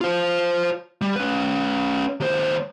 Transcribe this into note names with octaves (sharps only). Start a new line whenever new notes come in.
F4 C5
G3
C#4 B4
D#2 C5